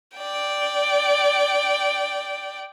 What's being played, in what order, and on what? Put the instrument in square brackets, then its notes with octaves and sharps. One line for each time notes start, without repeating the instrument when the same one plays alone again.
[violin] D5 G5